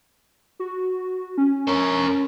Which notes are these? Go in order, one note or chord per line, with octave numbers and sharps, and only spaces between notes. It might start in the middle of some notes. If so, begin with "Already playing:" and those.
F#4
C#4
A#4 C#5